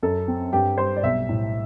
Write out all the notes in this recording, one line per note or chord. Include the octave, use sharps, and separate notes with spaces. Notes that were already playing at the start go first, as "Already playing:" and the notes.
F#2 A4
C4
G2 G4
G3 C5
D5
B1 E5
A2